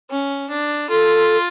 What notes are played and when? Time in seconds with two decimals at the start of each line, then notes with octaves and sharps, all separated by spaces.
0.10 C#4
0.49 D4
0.89 F4 A4